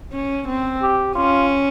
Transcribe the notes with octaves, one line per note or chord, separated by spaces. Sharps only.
C#4
C4
G4
C#4 F4